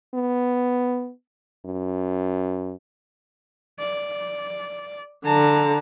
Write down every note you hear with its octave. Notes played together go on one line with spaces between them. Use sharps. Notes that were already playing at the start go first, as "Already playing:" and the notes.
B3
F#2
D5
D3 A5 A#5